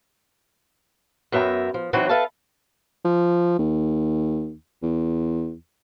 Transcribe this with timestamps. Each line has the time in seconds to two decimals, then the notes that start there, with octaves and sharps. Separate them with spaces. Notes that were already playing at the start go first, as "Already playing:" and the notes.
1.32 F#2 B3 E5 G5 A#5
1.74 F3
1.93 E3 F#3 C4 D#4 E4 F#4
2.09 A4 B4 E5 F5 A5
3.05 F3
3.59 D#2
4.83 E2